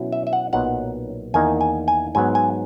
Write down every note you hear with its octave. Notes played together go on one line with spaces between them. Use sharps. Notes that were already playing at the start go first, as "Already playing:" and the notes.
Already playing: B2 F#3 C#4 E4
E5
E5
F#5
B1 A#2 F#3 B3 D#4 F#5
E2 D#3 A#3 D#4 G#5
G#5
G#5
G#2 F#3 B3 G#5
G#5